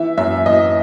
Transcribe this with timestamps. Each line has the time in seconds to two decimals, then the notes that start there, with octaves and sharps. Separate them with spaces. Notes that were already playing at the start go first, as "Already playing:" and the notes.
Already playing: E3 E5
0.18 F#2 E5
0.46 E3 D#5